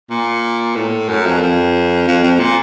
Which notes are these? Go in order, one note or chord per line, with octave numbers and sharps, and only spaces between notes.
A#2
A2
F#2
F2
F2
F2
F2
A#2